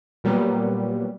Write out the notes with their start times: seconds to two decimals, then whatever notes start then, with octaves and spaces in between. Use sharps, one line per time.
0.24 A#2 F#3 G3 A#3 B3